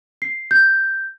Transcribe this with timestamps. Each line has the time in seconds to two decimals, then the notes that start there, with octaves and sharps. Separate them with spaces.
0.22 C7
0.51 G6